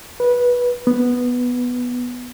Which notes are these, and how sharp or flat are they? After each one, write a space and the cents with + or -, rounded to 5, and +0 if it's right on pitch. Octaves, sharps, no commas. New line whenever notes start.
B4 -15
B3 -5